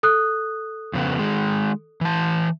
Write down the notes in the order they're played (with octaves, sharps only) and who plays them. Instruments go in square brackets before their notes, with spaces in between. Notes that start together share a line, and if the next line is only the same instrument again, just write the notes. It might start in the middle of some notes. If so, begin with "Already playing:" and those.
[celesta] A4 D#6 F#6
[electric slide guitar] F2 C#3 B3
D#3 G#3
E3 A5